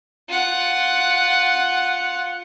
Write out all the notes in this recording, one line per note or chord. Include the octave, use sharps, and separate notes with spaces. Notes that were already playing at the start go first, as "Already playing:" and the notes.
F4 F#5